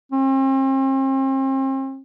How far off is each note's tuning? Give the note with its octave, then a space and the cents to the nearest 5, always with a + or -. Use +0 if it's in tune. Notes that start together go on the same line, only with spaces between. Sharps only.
C4 +40